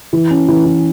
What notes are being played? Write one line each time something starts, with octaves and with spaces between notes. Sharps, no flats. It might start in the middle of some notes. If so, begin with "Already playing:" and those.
E3
C#4
E3
E3